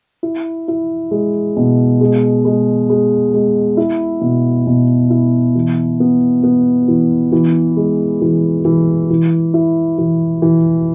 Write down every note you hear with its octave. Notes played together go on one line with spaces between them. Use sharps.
E4
E4
G#3
B2
G#3
G#3
G#3
G#3
E4
B2
B2
E4
E3
B3
B3
E3
E3
G#3
E3
E3
E3
E4
E3
E3